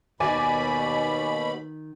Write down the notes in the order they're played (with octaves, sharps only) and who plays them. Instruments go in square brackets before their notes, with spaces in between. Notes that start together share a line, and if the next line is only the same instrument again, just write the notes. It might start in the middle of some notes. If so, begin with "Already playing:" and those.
[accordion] D#2 B2 B5 [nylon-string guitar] D#3 F#4 [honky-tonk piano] D5 G#5 D6